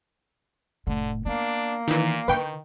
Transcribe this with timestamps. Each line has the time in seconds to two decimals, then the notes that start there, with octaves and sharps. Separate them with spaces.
0.87 F1 A2 D3
1.26 A#3 B3 D4
1.88 A#2 D#3 E3
2.28 D3 D#3 E4 B4 G5 C#6